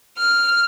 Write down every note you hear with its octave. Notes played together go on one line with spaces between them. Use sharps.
F6